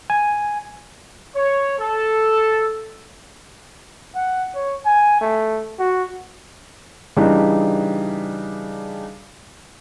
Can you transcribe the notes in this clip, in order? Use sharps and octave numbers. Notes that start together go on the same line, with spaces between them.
G#5
C#5
A4
F#5
C#5
G#5
A3
F#4
C#3 E3 G3 D4 D#4